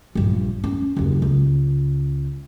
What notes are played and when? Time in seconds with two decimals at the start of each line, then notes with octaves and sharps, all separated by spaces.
0.15 A#1 G2
0.64 C#4
0.96 F#1 D#2
1.22 C#2